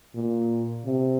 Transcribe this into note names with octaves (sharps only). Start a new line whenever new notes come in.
A#2
C3